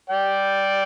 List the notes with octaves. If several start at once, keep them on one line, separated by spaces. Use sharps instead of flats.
D5 G5